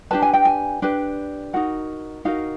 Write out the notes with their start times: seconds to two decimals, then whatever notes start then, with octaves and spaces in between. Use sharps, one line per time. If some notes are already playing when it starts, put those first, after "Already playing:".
0.11 D4 G4 B4 A5
0.22 G#5
0.33 G5
0.45 G#5
0.82 D4 G4 B4
1.53 D#4 F#4 A#4 F#5
2.25 D#4 F#4 A#4 F5